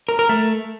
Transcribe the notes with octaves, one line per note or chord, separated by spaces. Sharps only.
A#4
A#4
A3